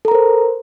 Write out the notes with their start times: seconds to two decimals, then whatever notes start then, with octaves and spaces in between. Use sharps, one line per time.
0.05 A4
0.08 A#5
0.11 A#4
0.15 C5